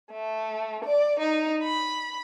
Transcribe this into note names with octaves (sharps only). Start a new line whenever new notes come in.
A3
D5
D#4
B5